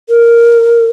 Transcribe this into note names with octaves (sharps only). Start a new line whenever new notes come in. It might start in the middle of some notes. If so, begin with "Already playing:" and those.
A#4